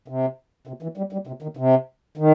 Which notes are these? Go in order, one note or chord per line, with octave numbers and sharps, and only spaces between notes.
C3
C3
E3
G3
G3
C3
D#3
C3
D#3